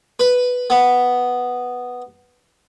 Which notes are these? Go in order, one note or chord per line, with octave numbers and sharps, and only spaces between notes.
B4
B3